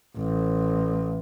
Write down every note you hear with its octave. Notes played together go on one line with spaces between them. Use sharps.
A1